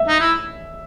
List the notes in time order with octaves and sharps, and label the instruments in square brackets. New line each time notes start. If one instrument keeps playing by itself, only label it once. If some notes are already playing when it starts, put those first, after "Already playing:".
Already playing: [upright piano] E5
[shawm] D#4
E4